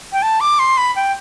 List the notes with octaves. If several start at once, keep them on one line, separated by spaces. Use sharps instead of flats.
G5
A5
D6
C6
B5
G5